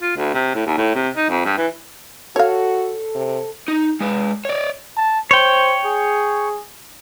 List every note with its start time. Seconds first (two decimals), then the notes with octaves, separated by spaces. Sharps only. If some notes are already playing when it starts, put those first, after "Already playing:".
0.02 F4
0.17 D2
0.34 C3
0.55 A2
0.66 D#2
0.77 A2
0.95 C3
1.16 D#4
1.29 F2
1.45 G2
1.57 E3
2.36 F#4 A4 C#5 F5
3.15 C3
3.68 D#4
4.00 G#3 B4
4.45 C#5 D5
4.97 A5
5.31 C5 C#5 G5
5.85 G#4